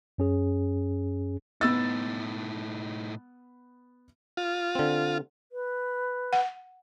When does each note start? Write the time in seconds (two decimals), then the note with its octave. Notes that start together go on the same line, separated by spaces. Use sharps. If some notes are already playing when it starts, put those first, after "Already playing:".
0.18 F#2 C#4 G#4
1.61 A2 B3 D#4 E6 A6
4.37 F4
4.75 D3 C4
5.52 B4
6.33 F#5